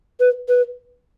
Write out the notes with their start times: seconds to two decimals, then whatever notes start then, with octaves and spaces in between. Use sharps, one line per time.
0.20 B4
0.48 B4